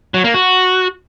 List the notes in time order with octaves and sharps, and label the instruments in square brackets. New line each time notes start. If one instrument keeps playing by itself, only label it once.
[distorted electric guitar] F#3
A#3
F#4